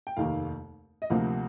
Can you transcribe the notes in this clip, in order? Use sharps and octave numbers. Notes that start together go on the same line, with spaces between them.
G5
F1 D#2 D#3 A#3 F5
D#5
D2 C3 F3 A#3 F5